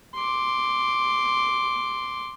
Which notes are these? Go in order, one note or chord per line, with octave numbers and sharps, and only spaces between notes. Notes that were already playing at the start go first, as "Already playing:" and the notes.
C6 D6